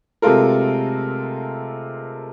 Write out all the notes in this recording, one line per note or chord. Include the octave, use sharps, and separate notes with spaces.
C3 G#3 A3 F4 A4 A#4